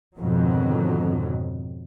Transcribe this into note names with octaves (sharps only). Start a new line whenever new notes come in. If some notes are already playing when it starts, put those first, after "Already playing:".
F2 G#2 B2 D3 D#3 F#3